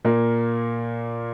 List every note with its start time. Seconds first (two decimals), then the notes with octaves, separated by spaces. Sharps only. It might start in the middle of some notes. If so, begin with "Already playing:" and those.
0.05 A#2 A#3